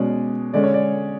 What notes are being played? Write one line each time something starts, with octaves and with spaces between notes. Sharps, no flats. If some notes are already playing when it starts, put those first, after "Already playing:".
Already playing: B2 G#3 C#4 D5
D3 G#3 C#4 D5
C#5
D5